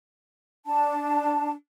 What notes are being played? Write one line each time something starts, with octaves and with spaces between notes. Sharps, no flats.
D4 A5